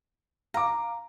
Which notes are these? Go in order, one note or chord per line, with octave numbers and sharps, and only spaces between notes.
F5 A#5 D6